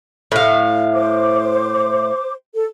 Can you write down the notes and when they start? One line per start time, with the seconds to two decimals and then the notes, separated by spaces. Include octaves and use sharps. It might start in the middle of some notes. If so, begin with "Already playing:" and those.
0.32 A2 F5
0.93 C5 D6
2.54 A4